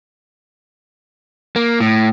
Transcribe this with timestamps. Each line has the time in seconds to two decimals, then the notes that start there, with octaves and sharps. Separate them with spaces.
1.56 A#3
1.80 A2